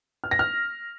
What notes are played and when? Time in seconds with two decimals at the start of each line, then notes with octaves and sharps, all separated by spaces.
0.24 F6
0.31 A#6
0.39 F6